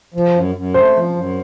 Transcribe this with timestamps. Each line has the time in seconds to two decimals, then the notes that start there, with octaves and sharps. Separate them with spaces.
0.14 F3
0.34 F#2
0.55 F#2
0.74 A3 C5
0.95 F3
1.16 F#2